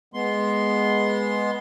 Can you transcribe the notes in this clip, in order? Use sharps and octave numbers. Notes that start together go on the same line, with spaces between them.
G#3 B3 C6